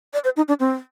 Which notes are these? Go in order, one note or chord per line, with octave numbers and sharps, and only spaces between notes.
D5
C5
D#4
D4
C4